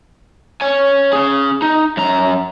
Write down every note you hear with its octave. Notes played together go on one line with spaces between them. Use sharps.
C#5 G#5
C#4 G#4
D#4
F#2 A#5